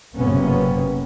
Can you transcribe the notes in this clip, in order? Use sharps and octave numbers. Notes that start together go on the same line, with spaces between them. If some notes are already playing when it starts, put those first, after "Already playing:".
F#1 F#2 C3 A#3 B3 C#4